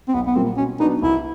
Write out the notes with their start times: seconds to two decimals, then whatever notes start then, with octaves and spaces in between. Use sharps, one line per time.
0.08 C4
0.14 B1 B3
0.27 B3
0.36 A#2 G3 A#3 C4
0.57 B2 C#4
0.80 F#3 B3 D4 D#4 F#4
1.02 C2 E4